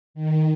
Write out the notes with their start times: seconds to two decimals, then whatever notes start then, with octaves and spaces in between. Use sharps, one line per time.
0.14 D#3